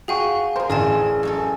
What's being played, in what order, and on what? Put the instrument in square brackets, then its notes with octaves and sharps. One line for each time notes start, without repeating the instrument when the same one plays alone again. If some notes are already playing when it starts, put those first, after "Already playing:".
[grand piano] F#4 G5 C#6 [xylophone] G#4 F5 G#5
[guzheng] G#4 A#4 [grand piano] C5
[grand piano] A1 [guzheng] G#4 A#4 [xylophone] D5 G#5 A5
[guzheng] F#2 C#4 A4